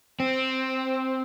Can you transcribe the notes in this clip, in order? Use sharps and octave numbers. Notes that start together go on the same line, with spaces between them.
C4